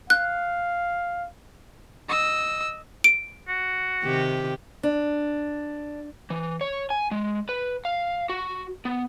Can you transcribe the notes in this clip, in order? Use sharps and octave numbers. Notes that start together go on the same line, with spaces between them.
F5 F#6
D#5 E6
D7
F#4
C3 D#3 G4
D4
E3
C#5
G#5
G#3
B4
F5
F#4
B3